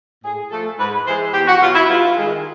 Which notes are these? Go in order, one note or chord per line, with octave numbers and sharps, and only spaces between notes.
A2 G#4
F3 A3 A4
G#2 B4
E3 G#3 C5
E2 G4
F#4
B2 F#3 F4
E4
G2 F4
D#3 G#3